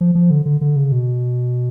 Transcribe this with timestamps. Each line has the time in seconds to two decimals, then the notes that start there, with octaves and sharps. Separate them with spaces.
0.01 F3
0.15 F3
0.31 D3
0.46 D3
0.61 D3
0.76 C#3
0.92 B2